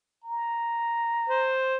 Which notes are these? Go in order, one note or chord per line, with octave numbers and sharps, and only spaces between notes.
A#5
C5